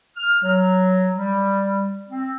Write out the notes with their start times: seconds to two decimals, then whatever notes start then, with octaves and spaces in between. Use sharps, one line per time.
0.16 F6
0.43 F#3
1.15 G3
2.09 C4